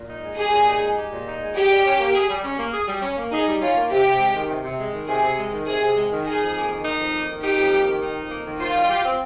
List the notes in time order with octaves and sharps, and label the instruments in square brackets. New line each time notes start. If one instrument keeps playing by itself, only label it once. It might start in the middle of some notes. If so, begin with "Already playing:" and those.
Already playing: [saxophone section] A#2
D#4
G#3
[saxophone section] G4 [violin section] G#4
[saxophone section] A#2
D#4
G#3
G4
A#2
D#4
G#3
[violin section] G4 [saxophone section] G#4
[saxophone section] G3
C#4
A#3
G#4
G3
C#4
A#3
G#4
G3
C#4
A#3
[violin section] D#4 [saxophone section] G#4
[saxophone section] G3
[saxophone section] C#4 [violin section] F4
[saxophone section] A#3
[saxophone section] C3 [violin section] G4
[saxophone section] C3
G#3
D#3
C3
C3
G#3
D#3
[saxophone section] C3 [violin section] G#4
[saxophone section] C3
G#3
D#3
[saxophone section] C3 [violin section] G#4
[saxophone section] C3
G#3
D#3
[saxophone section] D#4 [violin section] G#4
[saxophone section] F2
A#3
D#3
D#4
F2
A#3
D#3
[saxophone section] D#4 [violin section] G4
[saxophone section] F2
A#3
D#3
D#4
F2
A#3
D#3
[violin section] F4 [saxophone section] C5
[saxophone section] G3
G4
C4